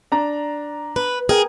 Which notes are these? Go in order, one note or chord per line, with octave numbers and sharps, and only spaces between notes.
D4 A#5
B4
G#4 A#4 G5